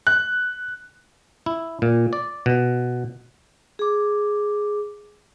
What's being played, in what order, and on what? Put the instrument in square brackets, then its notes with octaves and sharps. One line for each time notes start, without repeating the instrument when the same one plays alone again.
[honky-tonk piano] F#6
[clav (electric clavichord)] E4
A#2
D5
B2
[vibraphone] G#4 D6